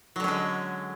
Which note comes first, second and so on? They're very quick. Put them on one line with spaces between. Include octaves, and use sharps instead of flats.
F#3 D3 C#4 G#3